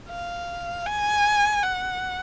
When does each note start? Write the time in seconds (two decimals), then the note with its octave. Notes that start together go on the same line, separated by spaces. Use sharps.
0.09 F5
0.86 G#5
1.62 F#5